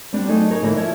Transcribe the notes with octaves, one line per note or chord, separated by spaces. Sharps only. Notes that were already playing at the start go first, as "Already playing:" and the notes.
G3 B3 C4 D4 G4
F#3 A3 D#4 G#4
D#4 G4 G#4 A#4 C#5
D3 E3 A#3 D#4 E4
F3 E4 C#5